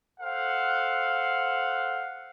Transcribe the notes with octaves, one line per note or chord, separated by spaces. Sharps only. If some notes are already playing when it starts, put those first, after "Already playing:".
A4 C5 F5 F#5